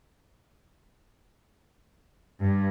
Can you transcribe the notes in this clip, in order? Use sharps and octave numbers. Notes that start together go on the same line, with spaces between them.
G2